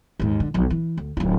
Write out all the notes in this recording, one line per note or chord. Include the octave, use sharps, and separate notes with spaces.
D#2 G#2
D3
B1 F3
E3
D2
D1 F4